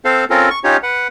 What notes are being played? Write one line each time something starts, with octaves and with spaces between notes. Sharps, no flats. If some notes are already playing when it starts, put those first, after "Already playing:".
C4 A4 C5 F5
C4 C#4 F4 A4 A#4
C#6
C#4 D#4 F4 G4 C#5
B4 F#5